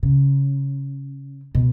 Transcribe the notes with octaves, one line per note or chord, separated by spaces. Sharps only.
C#3
B2